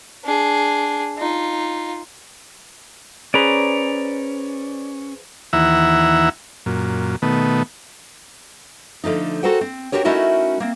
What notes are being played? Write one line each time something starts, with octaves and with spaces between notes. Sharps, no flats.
D4 G#4
D#4 F4
C#4 G#4 B4 C5 D5 A#5
D#2 E3 E4 E5 F#5 A#5
F#2 A#2
B2 D#3 A3 B3
D3 F3 A3 D#4
F#4 A4 A#4 C5 F#5 G5
C4
C4 F#4 G4 A#4 C#5
A3 C#4 D#4 E4 F#4 A#4
A#3 C4